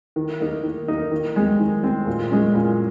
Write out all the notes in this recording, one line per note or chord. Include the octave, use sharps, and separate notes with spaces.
D#3
A#3 D#4
D#3
A#3 D#4
D#3
G#3 C4
D#3
G#3 C4
A#2
G#3 C#4
A#2